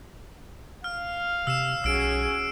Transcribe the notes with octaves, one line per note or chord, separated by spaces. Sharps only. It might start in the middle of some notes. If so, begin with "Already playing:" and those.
F5 F6
C3 E6 C7 E7
B1 C#4 F#4 G#4 E6 D7